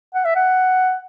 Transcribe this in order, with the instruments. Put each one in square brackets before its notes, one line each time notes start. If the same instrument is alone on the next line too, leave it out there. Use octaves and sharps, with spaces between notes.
[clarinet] F#5
E5
F#5